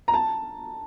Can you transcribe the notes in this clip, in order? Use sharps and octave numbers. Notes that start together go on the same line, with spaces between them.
A#5
A5